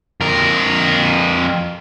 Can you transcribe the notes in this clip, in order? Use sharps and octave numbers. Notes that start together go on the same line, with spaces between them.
F2 A#4